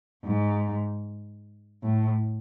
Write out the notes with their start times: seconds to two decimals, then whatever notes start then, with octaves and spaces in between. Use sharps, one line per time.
0.24 G#2
1.83 A2